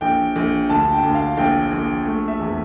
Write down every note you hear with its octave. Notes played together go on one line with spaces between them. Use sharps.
A#1 G5
A#1
D2 A5
G5
D2
F5
A#1 G5
A#1
A3
E5
E2